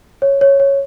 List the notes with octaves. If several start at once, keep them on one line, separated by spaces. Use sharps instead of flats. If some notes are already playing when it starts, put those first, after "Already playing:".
C#5
C#5
C#5